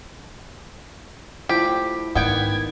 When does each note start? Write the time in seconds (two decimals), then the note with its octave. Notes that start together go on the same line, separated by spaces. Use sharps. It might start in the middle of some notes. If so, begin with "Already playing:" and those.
1.49 F3 A3 E4 G4
2.15 G#2 D#3 B3 G5 A5 D6 G#6